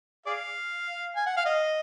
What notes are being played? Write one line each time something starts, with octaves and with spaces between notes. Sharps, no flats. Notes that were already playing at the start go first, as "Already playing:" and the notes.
G#4 D5 F5
G#5
F#5
F5
D#5